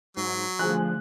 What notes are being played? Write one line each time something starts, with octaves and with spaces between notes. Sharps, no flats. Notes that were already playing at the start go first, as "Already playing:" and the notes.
G#2 F#3
D3 F3 G3 A3 G#4 G#5 F#6